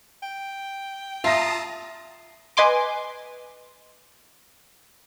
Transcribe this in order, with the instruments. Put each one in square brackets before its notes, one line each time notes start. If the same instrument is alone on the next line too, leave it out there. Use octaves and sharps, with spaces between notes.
[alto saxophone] G5
[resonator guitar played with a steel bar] F4 [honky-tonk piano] E5 A#6 [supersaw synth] A5 A#5 D#6
[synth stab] B4 D#5 G#5 C6 D6